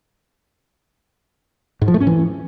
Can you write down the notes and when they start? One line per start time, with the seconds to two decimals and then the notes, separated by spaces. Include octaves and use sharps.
1.82 G#2
1.88 F3
1.94 A3
2.00 C#4
2.07 E3